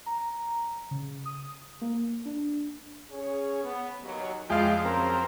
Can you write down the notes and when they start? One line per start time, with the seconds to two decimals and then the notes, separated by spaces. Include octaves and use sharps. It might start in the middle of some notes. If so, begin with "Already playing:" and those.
0.06 A#5
0.91 C#3
1.25 D#6
1.82 A#3
2.25 D4
3.11 C#4 G#4 C#5
3.63 B3
4.03 D#2 F#3
4.50 F2 G3 G#3 F4 F5 G5
4.85 C#3 F3 F#3 C4 A#4